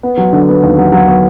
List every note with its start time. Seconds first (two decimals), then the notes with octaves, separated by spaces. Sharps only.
0.03 B3
0.17 F#3
0.33 D3
0.49 B3
0.63 D#2
0.78 F#3
0.92 F#3
1.08 B3